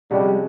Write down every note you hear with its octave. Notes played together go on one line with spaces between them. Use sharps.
C3 F3 G3 G#3 C#4 F#4